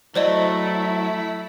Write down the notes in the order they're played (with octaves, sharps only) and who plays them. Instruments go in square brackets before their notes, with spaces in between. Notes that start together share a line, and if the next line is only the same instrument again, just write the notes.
[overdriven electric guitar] F#3 [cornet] A3 [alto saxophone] E4 [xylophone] C5 D5 D#5